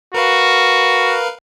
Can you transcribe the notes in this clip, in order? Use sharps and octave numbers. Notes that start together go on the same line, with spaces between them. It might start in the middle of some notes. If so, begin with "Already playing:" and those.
F#4 A#4 B4 F5